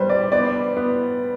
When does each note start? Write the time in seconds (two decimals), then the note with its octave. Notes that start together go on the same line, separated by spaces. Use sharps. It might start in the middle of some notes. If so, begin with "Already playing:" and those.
Already playing: G3 B4 C5
0.09 D5
0.32 B3 D5
0.77 B3